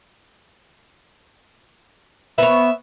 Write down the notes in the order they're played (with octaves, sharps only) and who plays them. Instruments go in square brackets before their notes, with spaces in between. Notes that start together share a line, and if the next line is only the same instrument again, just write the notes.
[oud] B3 C#5 [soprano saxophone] E5